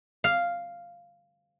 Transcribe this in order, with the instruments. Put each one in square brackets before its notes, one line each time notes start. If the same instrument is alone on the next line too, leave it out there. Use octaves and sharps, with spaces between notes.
[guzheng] F5